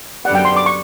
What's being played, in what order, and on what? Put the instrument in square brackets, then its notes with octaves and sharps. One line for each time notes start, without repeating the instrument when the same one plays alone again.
[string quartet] F#2 D3 G3 B3 [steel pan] F#5
[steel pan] G5
C6
D6
C#6